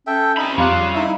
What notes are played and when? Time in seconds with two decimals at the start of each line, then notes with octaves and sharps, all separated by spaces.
0.07 C#4 A4 E5 G5
0.37 C3 D#4 B5
0.58 F2 C#4 F4 G4 F5 F#6
0.73 G3
0.94 D#4 E4 E5